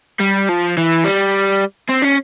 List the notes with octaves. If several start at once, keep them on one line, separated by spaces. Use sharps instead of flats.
G3
F3
E3
G3
C4
C#4